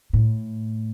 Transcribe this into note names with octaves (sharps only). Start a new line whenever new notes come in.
A2